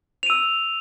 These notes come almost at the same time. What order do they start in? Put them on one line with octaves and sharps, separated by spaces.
F7 D#7 E6